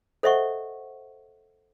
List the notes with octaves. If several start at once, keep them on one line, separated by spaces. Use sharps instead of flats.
A4 C5 D#5 E5 F#5 C#6